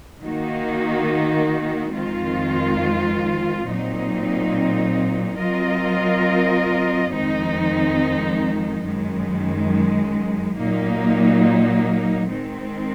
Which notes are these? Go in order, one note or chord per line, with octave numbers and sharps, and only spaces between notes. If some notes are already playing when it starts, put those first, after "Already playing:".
D#3 A#3 D#4 F#4
F2 D#3 G#3 C4 F4
A#2 F#3 C4 D#4
F#3 C4 F4 A#4 D#5
F2 D#3 G#3 C4 D#4
F#2 D#3 G#3
A#2 F#3 A#3 D#4
D#3 G#3 C4